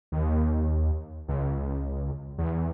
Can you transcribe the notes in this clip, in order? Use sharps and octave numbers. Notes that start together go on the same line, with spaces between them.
D#2
C#2
E2